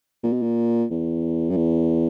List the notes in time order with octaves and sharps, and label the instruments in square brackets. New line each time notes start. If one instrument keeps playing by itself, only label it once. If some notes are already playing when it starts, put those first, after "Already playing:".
[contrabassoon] A#2
B2
A#2
E2
F#2
E2